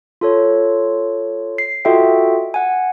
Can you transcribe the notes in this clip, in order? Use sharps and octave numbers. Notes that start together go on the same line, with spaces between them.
F4 A4 C#5
C7
F4 F#4 A4 D#5 E5 G5
F#5 G#5